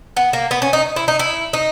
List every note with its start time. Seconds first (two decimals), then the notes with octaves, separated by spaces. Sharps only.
0.17 B3
0.33 A#3
0.51 B3
0.62 C#4
0.73 D#4
0.96 E4
1.08 D#4
1.19 E4
1.53 D#4